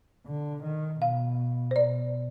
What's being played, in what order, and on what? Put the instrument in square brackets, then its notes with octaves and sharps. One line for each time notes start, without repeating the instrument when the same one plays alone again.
[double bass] D3
D#3
[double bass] B2 [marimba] F5
[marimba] C5
[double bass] B2 [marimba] D5